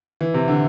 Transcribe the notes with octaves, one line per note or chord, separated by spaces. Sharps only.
E3
C3
D3